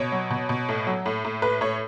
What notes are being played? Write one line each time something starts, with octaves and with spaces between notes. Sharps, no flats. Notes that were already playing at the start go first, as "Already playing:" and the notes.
Already playing: B2 C#5
F#3
B2
B2
A2
F#3
A2
A2
A2 B4
A2 C#5